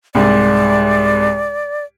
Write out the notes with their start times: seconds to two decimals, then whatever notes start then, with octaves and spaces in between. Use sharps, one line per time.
0.15 C2 G#2 D5